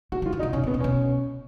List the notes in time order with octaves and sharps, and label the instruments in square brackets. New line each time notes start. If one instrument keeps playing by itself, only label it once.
[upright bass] A#3 [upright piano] F#4
[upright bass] F#3
[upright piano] F4
[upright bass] D#3
[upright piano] D#4
[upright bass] C#3
[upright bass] B2 [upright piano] C#4
[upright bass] A#2
[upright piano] B3
[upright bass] A#2
[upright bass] B2 [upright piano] C#4